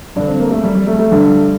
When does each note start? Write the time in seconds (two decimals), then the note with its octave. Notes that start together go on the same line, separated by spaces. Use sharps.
0.16 G2 D3 D4
0.27 C4
0.40 A#3
0.51 A3
0.64 G3
0.75 G3
0.87 A3
0.99 A3
1.11 G2 D3 G3